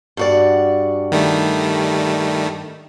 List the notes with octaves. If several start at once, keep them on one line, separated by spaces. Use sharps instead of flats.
G2 F#4 D5
D#3 G3 A3